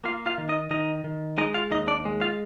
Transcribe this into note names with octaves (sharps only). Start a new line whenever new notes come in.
A#3 F4 F5
F4 F5
D#3
D#4 D#5
D#3 D#4 D#5
D#3
G#3 D#4 D#5
F4 F5
D#2 D#4 D#5
D4 D5
G#3
F4 F5